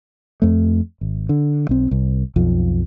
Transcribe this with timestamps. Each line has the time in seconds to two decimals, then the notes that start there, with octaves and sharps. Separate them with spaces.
0.42 F2 A3
1.01 G#1
1.29 D3
1.69 B1 C4
1.91 C2
2.36 B1 F2 F3